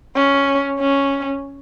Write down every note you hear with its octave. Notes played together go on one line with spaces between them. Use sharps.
C#4
C#4